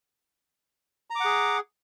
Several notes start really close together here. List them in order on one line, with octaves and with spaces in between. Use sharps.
A#5 D6 F#5 G#4